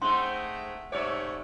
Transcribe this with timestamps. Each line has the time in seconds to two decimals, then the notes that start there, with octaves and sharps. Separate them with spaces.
0.02 G#3 A3 C4 D#4 F#5 C6
0.92 G#2 C3 A3 C#5 D5 B5 E6